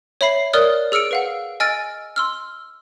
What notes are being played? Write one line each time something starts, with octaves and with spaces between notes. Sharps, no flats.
C#5 E5 B5 C7
A#4 C#5 D5 D#6 F6 F#6
G#4 E6 F6 C#7 D7
B4 F5 F#5
D#5 G#5 E6 F6 A6 D7
C6 E6 F6